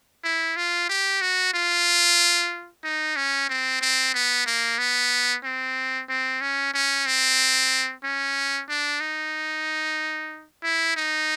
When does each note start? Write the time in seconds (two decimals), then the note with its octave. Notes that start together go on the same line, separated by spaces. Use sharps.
0.24 E4
0.56 F4
0.89 G4
1.21 F#4
1.53 F4
2.84 D#4
3.16 C#4
3.49 C4
3.81 C4
4.14 B3
4.46 A#3
4.78 B3
5.44 C4
6.09 C4
6.41 C#4
6.73 C#4
7.06 C4
8.03 C#4
8.69 D4
9.00 D#4
10.63 E4
10.96 D#4